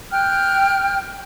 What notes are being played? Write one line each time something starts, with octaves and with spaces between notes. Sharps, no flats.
G5 F6 F#6